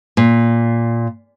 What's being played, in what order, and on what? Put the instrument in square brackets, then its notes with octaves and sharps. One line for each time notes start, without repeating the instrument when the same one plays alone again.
[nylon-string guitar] A#2